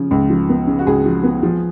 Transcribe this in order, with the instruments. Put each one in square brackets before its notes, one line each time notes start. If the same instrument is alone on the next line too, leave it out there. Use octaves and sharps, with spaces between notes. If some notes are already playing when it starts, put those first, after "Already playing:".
Already playing: [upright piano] C#3 F3
C#2
F3
B3
C#3
F#4
C#2 G#4
F3
B3
F3